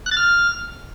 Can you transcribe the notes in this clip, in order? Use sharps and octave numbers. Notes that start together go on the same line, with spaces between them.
F#6
A6
F6